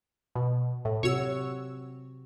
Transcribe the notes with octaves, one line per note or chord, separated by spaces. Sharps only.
B2
A2
C3 F#4 C#5 E6